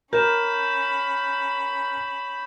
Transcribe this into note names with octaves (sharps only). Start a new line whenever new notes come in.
C#4 A#4 B5 G6 E7